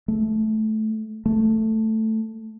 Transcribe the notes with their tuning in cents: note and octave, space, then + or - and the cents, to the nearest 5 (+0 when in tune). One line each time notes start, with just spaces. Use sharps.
A3 -15
A3 +5